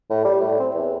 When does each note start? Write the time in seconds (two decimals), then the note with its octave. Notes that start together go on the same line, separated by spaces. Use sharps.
0.10 A2
0.25 G3
0.40 A2
0.60 C4
0.74 E2